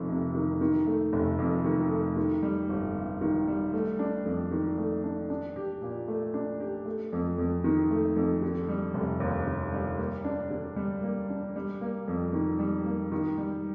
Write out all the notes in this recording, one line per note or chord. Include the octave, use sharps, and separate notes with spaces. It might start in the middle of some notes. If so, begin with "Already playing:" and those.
Already playing: F1 F2 D#3
C3
D#3
D#3
A3
F1
F2
D#3
A3
D#3
G3
G1
G2
D#3
G3
A3
D4
F2
D#3
A3
D4
D4
G4
A#2
A3
D4
G4
A3
F2
F2
D#3
A3
F2
D3
G3
F1
D#2
D3
G3
A#3
D4
D3
G3
A#3
D4
G3
A#3
F2
D#3
G3
A#3
D#3
G3